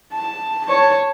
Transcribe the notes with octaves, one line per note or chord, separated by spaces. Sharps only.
A5
C#5 A5